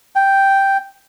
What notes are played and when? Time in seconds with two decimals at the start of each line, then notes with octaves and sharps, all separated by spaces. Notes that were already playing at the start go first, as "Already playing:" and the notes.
0.16 G5